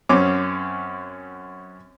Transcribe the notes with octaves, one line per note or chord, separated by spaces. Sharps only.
F#2 C4 C#4 D6